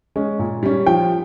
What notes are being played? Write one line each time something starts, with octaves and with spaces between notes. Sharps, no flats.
G#3 C#4
A#2
G3 C#4
F3 G5